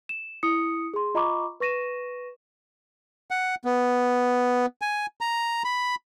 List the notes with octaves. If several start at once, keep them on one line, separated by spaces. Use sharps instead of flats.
E7
E4 D#6 C#7
G#4 C6
F4 D#5 A#5 B5 C#6 D6
B4 C#6 A#6 D#7 E7
F#5
B3
G#5
A#5
B5